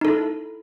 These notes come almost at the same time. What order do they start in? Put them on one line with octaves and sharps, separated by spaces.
D#4 A4 E4